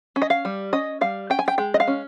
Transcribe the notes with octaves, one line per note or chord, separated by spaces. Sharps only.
C#4
D#5
F5
G3
C#4 D#5
G3 F5
C#4 G5
G#5
G5
G#3 G5
D#5
F5
C#4